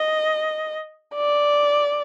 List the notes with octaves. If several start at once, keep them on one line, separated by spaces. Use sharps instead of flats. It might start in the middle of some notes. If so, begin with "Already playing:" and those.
Already playing: D#5
D5